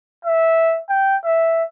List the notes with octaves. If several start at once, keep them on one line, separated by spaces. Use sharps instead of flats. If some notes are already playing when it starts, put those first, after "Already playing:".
E5
G5
E5